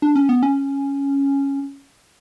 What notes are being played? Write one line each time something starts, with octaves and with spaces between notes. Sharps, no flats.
D4
C#4
B3
C#4